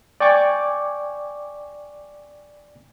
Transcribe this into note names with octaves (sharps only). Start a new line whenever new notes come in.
D5 G5 G#5 C#6 D6